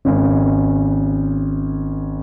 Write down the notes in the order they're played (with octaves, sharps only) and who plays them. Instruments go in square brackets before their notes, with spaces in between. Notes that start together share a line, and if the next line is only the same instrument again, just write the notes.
[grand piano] G#1 C#4